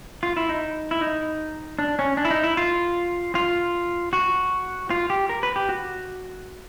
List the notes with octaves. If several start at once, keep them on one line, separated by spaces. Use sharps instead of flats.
F4
E4
D#4
E4
D#4
D4
C#4
D4
E4
D#4
E4
F4
F4
F#4
F4
G4
A#4
B4
G4
F#4